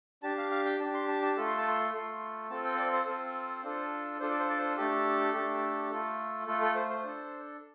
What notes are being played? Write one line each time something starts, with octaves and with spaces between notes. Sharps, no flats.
D4 G4 A5
F5
F5
G5
D4 G4 A5
C6
A5
A5
A3 F4 A4
C6
A5
C6
A3 F4 A4
C4 F4 A4 A5
G5
C5
D5
C5
C4 F4 A4
D4 F4 A4
D4 F4 A4 C5
D5
C5
D5
C5
A3 D4 G4 A4
A3 D4 G4
A3 F4 A4
A3 F4 A4
A4
C5
C5
D4 A4